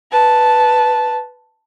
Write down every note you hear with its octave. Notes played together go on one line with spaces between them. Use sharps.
B4 A5